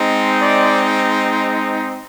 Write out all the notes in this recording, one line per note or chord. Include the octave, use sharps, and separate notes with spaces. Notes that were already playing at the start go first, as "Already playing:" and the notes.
Already playing: G#3 C4 D#4
D5